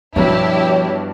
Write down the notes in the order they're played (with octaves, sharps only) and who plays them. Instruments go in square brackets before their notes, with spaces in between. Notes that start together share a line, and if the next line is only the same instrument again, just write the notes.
[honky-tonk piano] G2 B2 [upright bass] F3 [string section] E4 G4 [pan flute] C#5